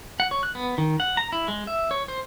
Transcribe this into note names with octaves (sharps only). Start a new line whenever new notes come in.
F#5
C#5
F#6
B3
D#3
F#5
A#5
E4
G#3
E5
C#5
C5